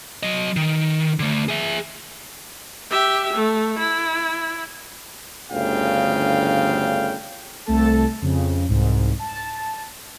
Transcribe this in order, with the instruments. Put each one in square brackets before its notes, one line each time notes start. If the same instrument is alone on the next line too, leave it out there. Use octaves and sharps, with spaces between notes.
[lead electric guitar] F#3 D#5
D#3
D3 A3
G#4 E5
[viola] G4 E5
A3
E4
[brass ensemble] G1 D2 C#3 F5 G5
[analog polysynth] C2 A3 A4 A5
F2 C#3
C2 G#2
A5